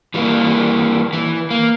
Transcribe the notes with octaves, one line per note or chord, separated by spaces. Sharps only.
E3 G3 A3 A#3
E3
A#3